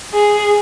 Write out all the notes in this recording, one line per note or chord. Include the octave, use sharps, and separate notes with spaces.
G#4